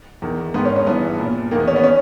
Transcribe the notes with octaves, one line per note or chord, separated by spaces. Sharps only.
E2 D#3
G#2 D#3 B3
C#4
C#4
G2 E3 B3
A#2
E2 D#3 A#3
B3
C#4
B3
C#4